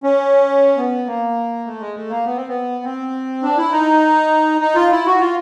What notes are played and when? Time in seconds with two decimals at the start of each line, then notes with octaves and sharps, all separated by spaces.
0.03 C#4
0.77 B3
1.07 A#3
1.66 A3
1.80 G#3
1.96 A3
2.10 A#3
2.25 B3
2.36 C4
2.48 B3
2.84 C4
3.43 D4
3.58 E4
3.72 D#4
4.61 D#4
4.75 F4
4.91 E4
5.06 F#4
5.20 F4